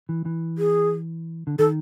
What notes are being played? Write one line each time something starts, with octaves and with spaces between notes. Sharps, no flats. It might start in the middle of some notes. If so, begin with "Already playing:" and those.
E3
E3
G#4
D3
D#3 A4